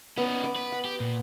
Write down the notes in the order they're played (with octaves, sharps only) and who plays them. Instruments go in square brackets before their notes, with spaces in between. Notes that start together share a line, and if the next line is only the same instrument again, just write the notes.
[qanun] B3 [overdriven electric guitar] C#4 D#4
[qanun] B3 D6
[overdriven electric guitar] B4
[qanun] F#5
[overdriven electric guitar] G4
A#2